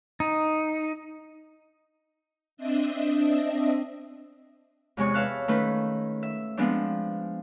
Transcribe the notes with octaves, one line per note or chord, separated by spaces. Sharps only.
D#4
C4 D4 D#5 E5
E2 C3 G#3 C#5 C#6
B4 C#5 E5 F5 A5 F#6
D#3 A3 C#4 B4
E5
F3 G#3 B3 C4 D4